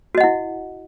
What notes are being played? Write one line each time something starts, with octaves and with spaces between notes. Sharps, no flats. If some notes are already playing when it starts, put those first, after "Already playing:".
E4 F#4 D#5 F#5